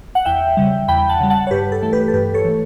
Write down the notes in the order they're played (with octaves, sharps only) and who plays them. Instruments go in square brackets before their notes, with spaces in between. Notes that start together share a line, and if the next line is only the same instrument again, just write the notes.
[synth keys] F#5
E2 E5 G5
C#3 G3
E2 G5 B5
F#5 A5
C#3 G3
F#5 A5
C#5
G2 G4 B4
A4
E3 A3
G4 B4
A4
G2 G4 B4
A4 C#5
E3 A3